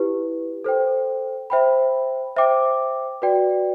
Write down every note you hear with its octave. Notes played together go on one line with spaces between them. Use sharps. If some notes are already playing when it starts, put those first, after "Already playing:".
Already playing: E4 G4 B4
A4 C5 G5
C5 E5 G5 B5
C5 E5 G5 D6
F#4 B4 D5 G5